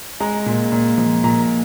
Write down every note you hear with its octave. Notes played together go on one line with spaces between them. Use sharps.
G#3 A#5
A#2
A#2
F3
A#2 A#5